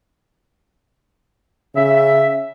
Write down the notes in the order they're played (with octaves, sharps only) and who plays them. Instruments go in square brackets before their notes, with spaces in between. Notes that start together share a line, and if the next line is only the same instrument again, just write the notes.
[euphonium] C#3 [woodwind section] E5